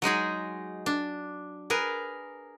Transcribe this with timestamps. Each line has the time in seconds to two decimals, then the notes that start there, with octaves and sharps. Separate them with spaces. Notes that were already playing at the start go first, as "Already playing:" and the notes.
0.02 F#3 G#3 D#4 G#4
0.86 D4
1.70 G#4 A#4 B4